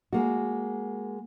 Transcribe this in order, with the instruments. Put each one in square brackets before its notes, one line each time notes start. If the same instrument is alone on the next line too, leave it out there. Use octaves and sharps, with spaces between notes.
[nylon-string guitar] G#3 A#3 F#4